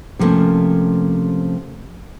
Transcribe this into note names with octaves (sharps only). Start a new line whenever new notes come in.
C3 F3 G3 A3 A#3 C#4